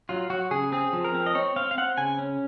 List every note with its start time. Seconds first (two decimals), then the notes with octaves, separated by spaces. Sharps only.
0.09 F#3 F4
0.30 F#3 F#4
0.51 C#3 G#4
0.72 C4 G#4
0.93 F3
1.04 A#4
1.15 C4
1.26 D#5
1.35 C4 C#5
1.56 C4 F5
1.71 F5
1.78 C4 F#5
1.98 C#3 G#5
2.19 C#4